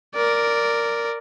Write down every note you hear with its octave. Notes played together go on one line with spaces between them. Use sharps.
A#4 D5